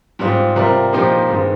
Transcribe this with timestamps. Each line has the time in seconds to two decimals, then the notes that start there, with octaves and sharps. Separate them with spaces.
0.19 G#2 G3 C4 F4
0.56 C3 G3 C4 F4 A#4
0.93 A#2 F3 C4 D#4 G4
1.29 G2 D#3 G#3 C4